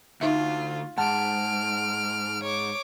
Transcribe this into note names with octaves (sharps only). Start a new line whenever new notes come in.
D2 D#4 F4 E5
G#2 F#5 A5 F6 D7
C#5 D6